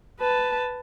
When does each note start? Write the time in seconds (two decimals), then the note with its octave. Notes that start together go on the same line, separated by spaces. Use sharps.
0.20 B4 A5